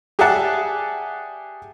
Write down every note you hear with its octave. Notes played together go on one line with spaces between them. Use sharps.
G4 G#4 D5 E5 F#5 A5